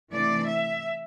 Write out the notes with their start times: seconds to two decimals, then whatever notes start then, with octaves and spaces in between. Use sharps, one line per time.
0.11 C3 E3 A3 D4 D5
0.47 E5